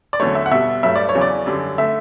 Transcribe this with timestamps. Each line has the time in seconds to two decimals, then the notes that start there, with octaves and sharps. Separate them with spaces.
0.13 D5
0.20 E2 D3 F#3 A3 C#5
0.35 E5
0.46 F#5
0.51 B2 G3 E5
0.83 G2 F#3 A3 E5
0.96 D5
1.09 C#5
1.15 E2 C#3 F#3
1.21 D5
1.46 F#2 D3 G3
1.78 D3 A3 E5